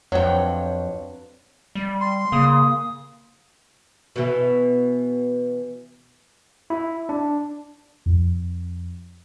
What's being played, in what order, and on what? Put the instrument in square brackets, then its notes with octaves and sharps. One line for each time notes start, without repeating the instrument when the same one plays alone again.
[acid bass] F2 [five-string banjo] F#3 G5 [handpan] C4 D4 B4 [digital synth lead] C#5
[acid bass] G3
[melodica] C6
[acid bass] C#3 [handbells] A#3 D#6
[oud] B2 E3
[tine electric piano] E4
D4
[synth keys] F2